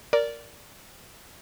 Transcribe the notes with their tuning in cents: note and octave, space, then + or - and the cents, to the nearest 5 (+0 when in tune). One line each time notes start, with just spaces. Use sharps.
A#4 +0 D5 -10